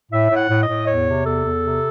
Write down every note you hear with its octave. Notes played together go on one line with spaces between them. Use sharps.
A2 E5
A2
F#5
A2
D#5
A2
E2 C#5
C3
E2 A4
E2
C3